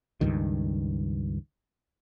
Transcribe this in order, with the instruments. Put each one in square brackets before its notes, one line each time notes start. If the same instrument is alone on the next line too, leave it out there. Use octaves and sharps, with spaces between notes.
[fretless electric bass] C#2 G2 D#3